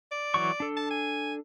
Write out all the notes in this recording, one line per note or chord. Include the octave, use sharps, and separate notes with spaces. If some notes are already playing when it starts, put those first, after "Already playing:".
D5
E3 F#3 C#6
D4 A4
A5
G#5